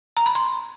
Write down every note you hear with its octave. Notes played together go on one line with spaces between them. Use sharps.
A#5
B5
C6